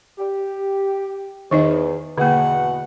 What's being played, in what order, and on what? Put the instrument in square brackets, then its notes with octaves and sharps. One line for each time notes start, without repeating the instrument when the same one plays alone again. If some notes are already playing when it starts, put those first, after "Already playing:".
[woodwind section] G4
[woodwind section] E2 [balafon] D#3 D#4 D#5
[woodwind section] E2 B2 F#5 [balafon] D3 A#3